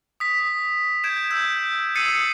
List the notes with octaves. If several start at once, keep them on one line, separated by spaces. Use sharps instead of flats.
D#6 B6
G6 G#6 D7 E7
E6 G6
D#6 E6 A6 C7 C#7 D#7